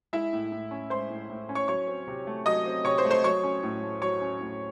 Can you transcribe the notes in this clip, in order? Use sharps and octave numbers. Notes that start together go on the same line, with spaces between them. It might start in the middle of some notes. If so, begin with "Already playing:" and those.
G#3 E4 E5
A2
A2
C#4
G#3 C5 C6
A2
A2
C#4
C#5 C#6
F#3 C#5 C#6
C4
C3
A3
F#3 D#5 D#6
C4
C3 C#5 C#6
C5 C6
A3
C5 C6
F#3 C#5 C#6
C#4
A2
A3
F#3 C#5 C#6
C#4
A2